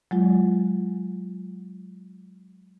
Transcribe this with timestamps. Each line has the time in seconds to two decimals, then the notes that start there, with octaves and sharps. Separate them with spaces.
0.11 F#3 G#3 F4